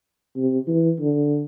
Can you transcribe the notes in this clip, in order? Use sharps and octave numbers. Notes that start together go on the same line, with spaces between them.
C3
E3
D3